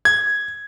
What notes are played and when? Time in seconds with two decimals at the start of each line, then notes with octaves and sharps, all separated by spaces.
0.05 G#6